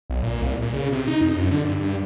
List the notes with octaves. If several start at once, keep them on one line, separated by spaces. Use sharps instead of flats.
B1
A#2
C2
A#2
C#3
C3
D#4
F2
F#2
D3
G2
G2